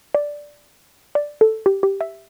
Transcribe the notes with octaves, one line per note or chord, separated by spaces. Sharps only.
D5
D5
A4
G4
G4
E5